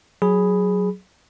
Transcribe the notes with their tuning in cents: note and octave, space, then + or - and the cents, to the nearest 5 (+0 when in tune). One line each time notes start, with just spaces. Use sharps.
F#3 +0 G#4 +0 B5 +0